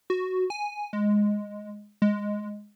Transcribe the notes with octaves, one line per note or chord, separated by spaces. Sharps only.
F#4
G#5
G#3
G#3